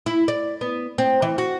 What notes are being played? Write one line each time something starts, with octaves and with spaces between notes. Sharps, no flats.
E4
D5
B3
C4
E3
F#4